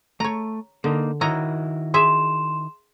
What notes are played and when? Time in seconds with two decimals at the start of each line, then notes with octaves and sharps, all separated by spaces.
0.20 A3 C#5 A#5
0.84 D3 A#3 D#4
1.21 D#3 E4 F#4 C#5 D#5 A#5
1.94 G#4 E5 C6 E7